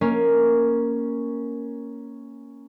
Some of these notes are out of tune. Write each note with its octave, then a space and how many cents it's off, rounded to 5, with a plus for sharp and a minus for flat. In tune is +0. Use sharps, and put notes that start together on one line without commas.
A#3 +0 C#4 +0